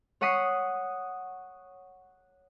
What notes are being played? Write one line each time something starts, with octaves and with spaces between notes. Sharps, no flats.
C#5 F#5 C#6 D#6 B6 C7